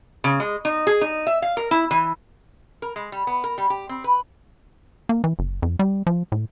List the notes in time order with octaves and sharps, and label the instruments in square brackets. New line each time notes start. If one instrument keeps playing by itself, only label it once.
[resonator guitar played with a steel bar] C#3
G#3
D#4
G#4
D#4
E5
F5
A#4
E4
E3
A#4
G#3
G3
B3
A#4
G3
G4
C4
B4
[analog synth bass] A#3
E3
F#1
F2
G3
F3
A2